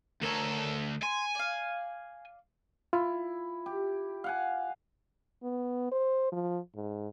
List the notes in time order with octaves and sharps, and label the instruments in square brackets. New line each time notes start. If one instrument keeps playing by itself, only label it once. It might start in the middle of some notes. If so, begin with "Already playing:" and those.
[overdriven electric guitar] D2 A4 [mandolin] A#4 C#5 G#5
[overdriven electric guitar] G#5 [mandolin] C6
[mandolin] D5 F5
[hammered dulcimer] E4 [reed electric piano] F4
[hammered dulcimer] G4
F5 F#5 G#5
[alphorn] B3
C5
F3
G#2